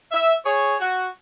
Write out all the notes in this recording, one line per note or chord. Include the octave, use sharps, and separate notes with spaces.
E5
G#4 C#5
F#4